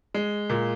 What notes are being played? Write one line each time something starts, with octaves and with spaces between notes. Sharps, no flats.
G#3
A#2